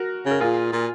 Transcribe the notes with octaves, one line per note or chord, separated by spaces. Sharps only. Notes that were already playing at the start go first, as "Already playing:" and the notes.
Already playing: F#4 A#4
C#3
A#4
A#2 F4 G#4
A#2